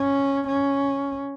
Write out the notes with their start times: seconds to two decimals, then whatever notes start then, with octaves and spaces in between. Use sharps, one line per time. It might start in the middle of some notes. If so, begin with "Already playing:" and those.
Already playing: C#4
0.47 C#4